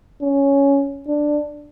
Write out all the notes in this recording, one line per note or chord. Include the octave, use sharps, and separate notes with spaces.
C#4
D4